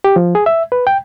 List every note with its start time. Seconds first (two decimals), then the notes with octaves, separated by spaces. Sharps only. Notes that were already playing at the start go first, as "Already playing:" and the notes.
0.04 G4
0.16 F3
0.35 G#4
0.46 E5
0.72 B4
0.87 G5